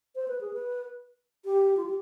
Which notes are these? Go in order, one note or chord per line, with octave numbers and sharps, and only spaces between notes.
C5
B4
G#4
B4
G4
F4
G4